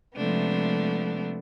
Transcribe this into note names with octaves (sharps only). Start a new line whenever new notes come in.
C3 F3 G#3 A3 B3 D4